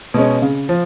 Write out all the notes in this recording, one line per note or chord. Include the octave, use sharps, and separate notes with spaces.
B2 G#3 C#4
C#3
F3